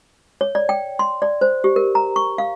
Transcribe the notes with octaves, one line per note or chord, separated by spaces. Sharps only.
C#5
D5
G5
C6
D5
C5
G4
A#4
A#5
C#6
F5